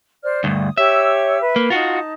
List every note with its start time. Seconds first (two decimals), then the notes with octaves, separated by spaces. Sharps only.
0.24 C5 D5 F6
0.44 D2 G2 D#6
0.78 G4 C#5 E5 E6
1.40 B4
1.56 A#3
1.70 D#4 F4 F#4 A5